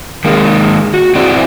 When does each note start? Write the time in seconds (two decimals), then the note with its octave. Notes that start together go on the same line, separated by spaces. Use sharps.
0.25 D#3 G#3 A#3
0.94 F#4
1.15 C4 E4 F#4 G#4 D5